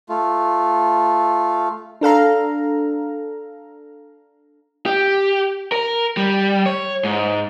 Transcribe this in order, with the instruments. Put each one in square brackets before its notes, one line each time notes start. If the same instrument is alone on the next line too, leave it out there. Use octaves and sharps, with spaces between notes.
[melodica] A3 F4
[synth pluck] D4 A4 F5 A#5
[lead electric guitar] G4
A#4
G3
C#5
G#2